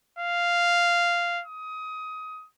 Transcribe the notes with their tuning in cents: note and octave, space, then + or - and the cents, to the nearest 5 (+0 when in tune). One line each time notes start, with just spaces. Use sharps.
F5 -5
D#6 +20